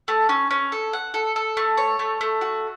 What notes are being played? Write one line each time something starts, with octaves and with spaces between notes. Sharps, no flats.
A3
C#4
C#4
A4
F#5
A4
A4
A3
C#5
A3
A3
F#4